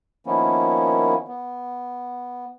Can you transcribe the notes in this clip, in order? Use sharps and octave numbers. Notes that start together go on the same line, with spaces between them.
D#3 F3 A#3 B3 C#4 E4
B3